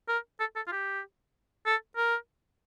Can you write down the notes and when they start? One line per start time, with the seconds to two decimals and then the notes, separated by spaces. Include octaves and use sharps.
0.08 A#4
0.40 A4
0.56 A4
0.67 F4
0.72 G4
1.66 A4
1.97 A#4